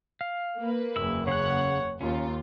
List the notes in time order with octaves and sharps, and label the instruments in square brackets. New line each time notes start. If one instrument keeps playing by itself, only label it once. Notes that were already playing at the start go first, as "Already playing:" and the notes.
[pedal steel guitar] F5
[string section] A#3 B4
[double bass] F#1 E2 [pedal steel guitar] E4 E6
[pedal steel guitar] C#3 F#6 [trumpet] C#5 [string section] F#5
[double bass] D#2 [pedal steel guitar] C#4 [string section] F4